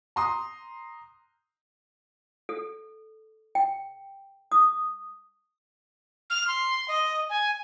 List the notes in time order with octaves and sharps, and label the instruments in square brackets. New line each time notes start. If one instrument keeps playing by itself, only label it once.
[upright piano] A#5 C6 D#6
[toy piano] A4
G5
D#6
[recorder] F6
C6
D#5
G#5